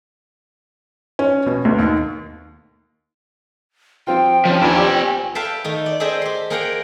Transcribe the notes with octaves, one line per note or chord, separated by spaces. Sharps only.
C#4
B2
D2
D#2
F3 C4 F4 G5
F3 C4 C#4
D#2 C4 D4 B4 G#5
F4 G4 D5
A4 B4 E5 F5 G5 A5
D#3 A3 D#4
D5
G#4 A4 C5 D#5 E5 G5
G4 C6
A#3 G#4 A#4 F#5 G5 A#5